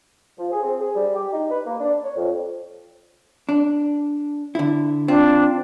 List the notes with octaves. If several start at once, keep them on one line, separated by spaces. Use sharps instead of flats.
F3
G#4
C4
G#4
G3
G4
D#4
B4
A#3
D4
C#5
F2
D4
D3 E4
C4 D4 F4